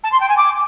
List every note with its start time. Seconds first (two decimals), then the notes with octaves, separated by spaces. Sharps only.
0.03 A5
0.12 C6
0.20 G5
0.29 G#5
0.37 D6